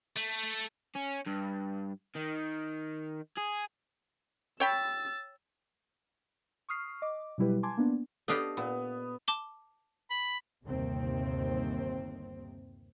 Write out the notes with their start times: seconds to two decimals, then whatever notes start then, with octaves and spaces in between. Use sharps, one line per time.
0.16 A3
0.96 C#4
1.27 G2
2.16 D#3
3.38 G#4
4.60 C#5 G5 B5 E6 A6
6.69 C#6 D#6 F6 C7
7.02 D#5 D6
7.38 B2 F#3 G3 E4 G4 B4
7.63 G#5 A5 C6 D6 G#6
7.77 A#3 B3 D4
8.28 B3 D4 G4 A4 D#5 F5
8.57 A#2 B3
9.28 A5 D6 G7
10.10 B5
10.63 G1 D#2 C3 C4